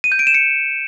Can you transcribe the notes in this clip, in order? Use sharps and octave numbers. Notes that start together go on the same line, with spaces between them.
D#7
G6
D7
E7
C#7